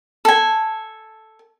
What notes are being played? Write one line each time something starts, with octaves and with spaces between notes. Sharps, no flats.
A4 G#5